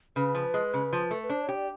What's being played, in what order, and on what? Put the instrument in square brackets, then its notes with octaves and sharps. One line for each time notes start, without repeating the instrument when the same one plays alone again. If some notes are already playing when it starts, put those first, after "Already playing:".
[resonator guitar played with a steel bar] C#3 [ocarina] B4
[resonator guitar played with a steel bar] F3
G#3
C#3
F3
A3
[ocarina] B4
[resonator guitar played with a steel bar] D4 [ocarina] C5
[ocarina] C#5
[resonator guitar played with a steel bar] G4
[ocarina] D5